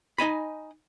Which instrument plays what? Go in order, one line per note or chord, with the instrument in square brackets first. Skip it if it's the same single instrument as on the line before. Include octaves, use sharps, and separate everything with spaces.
[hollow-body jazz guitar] D#4 D#5 G#5 B5